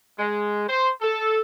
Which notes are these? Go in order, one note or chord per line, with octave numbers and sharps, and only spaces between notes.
G#3
C5
A4